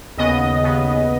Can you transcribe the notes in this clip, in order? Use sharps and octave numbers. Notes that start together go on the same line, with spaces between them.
D#2 C#3 B3 D#5
D#2 C#3 B3